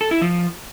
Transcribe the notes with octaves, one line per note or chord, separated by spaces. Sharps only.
A4
E4
F3